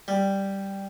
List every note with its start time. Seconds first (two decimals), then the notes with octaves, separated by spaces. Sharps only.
0.08 G3